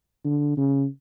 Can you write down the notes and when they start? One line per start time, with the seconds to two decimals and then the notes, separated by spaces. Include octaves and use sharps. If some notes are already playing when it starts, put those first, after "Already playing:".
0.24 D3
0.57 C#3